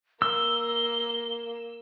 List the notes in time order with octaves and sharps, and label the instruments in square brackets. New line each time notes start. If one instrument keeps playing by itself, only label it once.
[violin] A#3 [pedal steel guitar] E6 [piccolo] G7